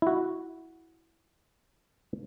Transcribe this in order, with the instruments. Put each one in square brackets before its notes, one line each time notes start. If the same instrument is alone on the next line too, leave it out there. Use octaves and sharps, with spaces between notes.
[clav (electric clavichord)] E4 F#4